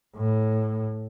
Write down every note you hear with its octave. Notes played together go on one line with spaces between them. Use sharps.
A2